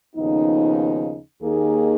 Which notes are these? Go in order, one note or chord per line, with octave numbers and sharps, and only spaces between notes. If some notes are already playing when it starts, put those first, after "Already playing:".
D#2 C#3 F3 B3 D#4
D#2 D#3 A#3 D#4 G#4